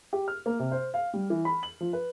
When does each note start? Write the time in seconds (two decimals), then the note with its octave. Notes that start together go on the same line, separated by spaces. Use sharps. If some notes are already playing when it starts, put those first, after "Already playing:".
0.13 G4
0.28 F6
0.46 A#3
0.59 C3
0.72 C5
0.94 F5
1.14 G3
1.30 E3
1.45 B5
1.63 F#7
1.81 F3
1.93 B4